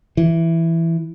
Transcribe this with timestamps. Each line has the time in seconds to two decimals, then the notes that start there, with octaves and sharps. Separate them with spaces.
0.17 E3